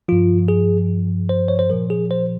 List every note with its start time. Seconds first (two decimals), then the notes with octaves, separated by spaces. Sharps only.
0.08 G2 F3 F4
0.48 G#4
1.29 C5
1.48 C#5
1.59 C5
1.70 A#2 F3 A#4
1.90 G#4
2.11 C5